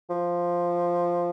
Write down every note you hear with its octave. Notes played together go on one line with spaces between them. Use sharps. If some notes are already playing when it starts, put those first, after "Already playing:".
F3